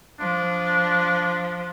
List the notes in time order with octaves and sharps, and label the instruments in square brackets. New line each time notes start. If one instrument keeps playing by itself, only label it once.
[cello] F3 [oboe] D4